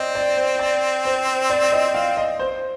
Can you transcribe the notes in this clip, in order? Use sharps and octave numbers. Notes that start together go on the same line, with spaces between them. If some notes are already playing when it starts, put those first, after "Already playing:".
Already playing: C4 D5 D#5
D5
C5
D5
C5
D5
D#5
F5
D#5
C5